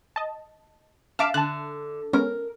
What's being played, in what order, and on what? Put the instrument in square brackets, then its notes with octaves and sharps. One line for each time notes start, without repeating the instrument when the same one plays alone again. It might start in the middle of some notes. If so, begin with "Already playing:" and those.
[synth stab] D#5 A5
[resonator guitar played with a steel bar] E5 F5 A5 [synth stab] D6 F6
[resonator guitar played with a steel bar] D3 [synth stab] A5 F#6
[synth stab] G#3 B3 C#4 [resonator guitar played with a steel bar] A#4